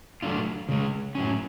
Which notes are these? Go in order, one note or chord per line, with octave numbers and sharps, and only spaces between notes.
F#3 A3 D4 F4
C#3 G#3 C#4
A2 F#3 C#4